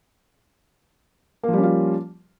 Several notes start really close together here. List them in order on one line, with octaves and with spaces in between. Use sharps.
A#3 F3 G3 C#4 F4